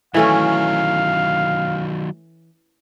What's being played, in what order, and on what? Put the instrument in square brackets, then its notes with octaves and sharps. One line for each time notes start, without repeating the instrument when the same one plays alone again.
[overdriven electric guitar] D#3 F#3 [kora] E3 A3 C#4 [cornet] F5